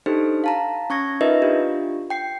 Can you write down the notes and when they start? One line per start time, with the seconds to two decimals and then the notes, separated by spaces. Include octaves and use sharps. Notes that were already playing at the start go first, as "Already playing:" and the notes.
0.06 D4 D#4 G4 A4 C5
0.44 F5 A5 A#5
0.90 C#4 C#6 G#6 A#6
1.21 D#4 F4 A#4 B4 D#5 E5
1.42 D4 F4 G4
2.10 G5 C7